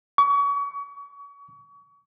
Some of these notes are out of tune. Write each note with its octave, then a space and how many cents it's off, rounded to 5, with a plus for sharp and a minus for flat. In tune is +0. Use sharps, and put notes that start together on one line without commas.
C#6 +35